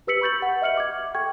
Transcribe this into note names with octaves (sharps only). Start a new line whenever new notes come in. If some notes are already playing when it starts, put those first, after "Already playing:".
G4 B4 E6 B6 C#7 F#7
B5 C#6 G6 A6 F#7
F#5
D#5 E5 F6 C#7 F#7
D6 G#6
A4 G5 C#6 G#6